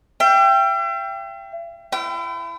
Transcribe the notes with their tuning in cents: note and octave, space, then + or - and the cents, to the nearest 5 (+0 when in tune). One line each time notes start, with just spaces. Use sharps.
E5 +45 G5 +0
E4 +35 G5 -30